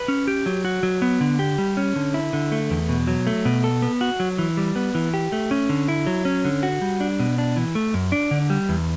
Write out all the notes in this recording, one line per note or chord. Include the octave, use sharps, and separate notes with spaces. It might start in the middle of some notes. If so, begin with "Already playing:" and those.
Already playing: B4
C#4
G4
F#3
F#4
F#3
B3
D3
G4
G3
C#4
D3
E4
D3
A3
E2
B2
F#3
A3
B2
A4
B3
F#4
F#3
E3
G3
B3
E3
G4
A3
C#4
D3
E4
F#3
C#4
D3
F#4
G3
D4
B2
D4
E3
A3
F#2
D4
D3
G3
E2